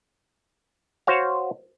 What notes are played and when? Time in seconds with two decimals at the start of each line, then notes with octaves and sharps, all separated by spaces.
1.07 F#4 C5 C#5 F5